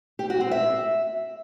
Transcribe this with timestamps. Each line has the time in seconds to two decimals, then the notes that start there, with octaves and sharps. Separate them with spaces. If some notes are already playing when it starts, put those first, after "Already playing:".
0.19 G4
0.30 F#4
0.41 C4
0.51 E5